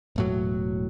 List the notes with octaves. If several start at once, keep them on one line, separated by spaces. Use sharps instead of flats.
E1 A2 F#3